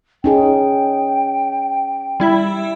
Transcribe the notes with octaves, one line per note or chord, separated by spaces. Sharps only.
C#4 D#4 G#4 G5
G3 E4 E5